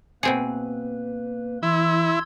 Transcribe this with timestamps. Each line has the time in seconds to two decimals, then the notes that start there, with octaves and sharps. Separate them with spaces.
0.23 B2 A#3 C4 G#4 B4
1.63 E3 E4 C6 E6 G#6